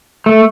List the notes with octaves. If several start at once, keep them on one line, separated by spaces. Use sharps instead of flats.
A3